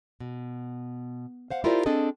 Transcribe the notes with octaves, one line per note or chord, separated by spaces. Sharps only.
B2
C5 F5 F#5
E4 F4 G4 A#4 C5 D5
C4 D4 G#4 A4 D#5